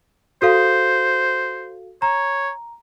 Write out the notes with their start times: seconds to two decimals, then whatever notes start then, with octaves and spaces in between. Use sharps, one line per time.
0.42 F#4 A4 C5 F5
2.02 C#5 A#5